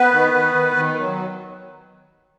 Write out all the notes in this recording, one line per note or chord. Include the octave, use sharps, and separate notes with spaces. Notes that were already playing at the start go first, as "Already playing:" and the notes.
Already playing: B3 B4
D#3
D#3
D#3
D#3
F#3